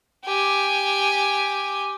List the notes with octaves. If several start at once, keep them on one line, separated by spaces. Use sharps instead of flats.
G4 G#5